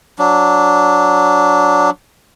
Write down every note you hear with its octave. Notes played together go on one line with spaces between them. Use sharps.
F#3 D4